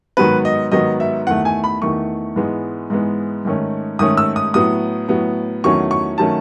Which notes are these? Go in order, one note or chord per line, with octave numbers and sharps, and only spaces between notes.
G#2 D#3 F#3 B3 B4
D#5
G#2 D#3 F#3 B3 D#5
E5
E2 D#3 A3 F#5
G#5
B5
E2 D#3 A3 C#6
G#2 E3 G#3 B3
G#2 E3 G#3 B3
G#2 D#3 A3 C#4
G#2 D#3 A3 C#4 D#6
E6
D#6
A2 F#3 B3 D#6
A2 F#3 B3
E2 D#3 F#3 A3 C#4 C#6
C#6
D#3 F#3 A3 C#4 A5